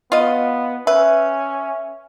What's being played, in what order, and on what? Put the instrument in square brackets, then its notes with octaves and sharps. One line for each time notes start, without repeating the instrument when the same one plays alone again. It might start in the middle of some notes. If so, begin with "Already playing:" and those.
[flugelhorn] B3 [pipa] F4 D#5
[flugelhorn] C#4 [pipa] B4 [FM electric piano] E5